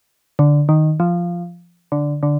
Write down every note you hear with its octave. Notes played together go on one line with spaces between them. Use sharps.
D3
D#3
F3
D3
D3